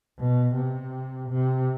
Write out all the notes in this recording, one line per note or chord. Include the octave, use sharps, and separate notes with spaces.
B2
C3
C3